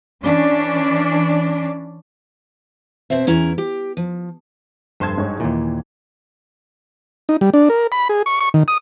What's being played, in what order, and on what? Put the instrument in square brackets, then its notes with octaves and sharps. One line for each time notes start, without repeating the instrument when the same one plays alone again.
[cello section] E3 C#4 D4 D5
[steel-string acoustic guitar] B2 C4 C5 E5
E2 C#4 E4 A#5
G4
F3
[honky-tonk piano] F1 C6 G#6 [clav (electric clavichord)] G2 C5 A5
[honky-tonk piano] G#2 C#5
[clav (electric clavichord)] D#2 A#2 [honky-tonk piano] E3
[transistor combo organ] D#4
G3
D4
A#4
B5
G#4
C#6
C#6
D#3
D#6